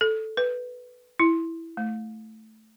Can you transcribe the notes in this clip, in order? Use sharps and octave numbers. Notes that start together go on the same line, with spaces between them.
A4
B4
E4
A3